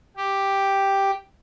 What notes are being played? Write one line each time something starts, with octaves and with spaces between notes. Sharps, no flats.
G4